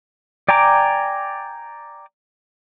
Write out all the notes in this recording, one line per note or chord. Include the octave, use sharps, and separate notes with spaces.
D5 G5 G#5 A#5 D6